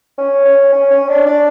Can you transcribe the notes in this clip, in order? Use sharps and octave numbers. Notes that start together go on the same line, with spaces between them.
C#4
C#4
C#4
C#4
D4
D4